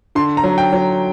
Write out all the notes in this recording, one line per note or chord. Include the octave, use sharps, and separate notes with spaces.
D3 C6
A#5
F#3
G5
F#3